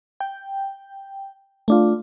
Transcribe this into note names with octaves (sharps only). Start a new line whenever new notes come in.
G5
A3 D4 F4